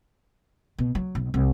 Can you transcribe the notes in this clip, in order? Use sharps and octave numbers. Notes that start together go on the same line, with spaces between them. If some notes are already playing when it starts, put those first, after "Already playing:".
B2
F#3
B1
C2